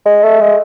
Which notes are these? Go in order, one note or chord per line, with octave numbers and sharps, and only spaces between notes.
G#3
A3
G#3